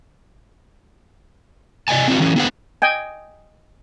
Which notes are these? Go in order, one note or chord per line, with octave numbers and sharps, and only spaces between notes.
C3 D5 D#5 G#5 A5
C4 D4 E4 F#4
E3 F#3 C#4
B3 D4 G#4 C5 F#5
D#5 G5 G#5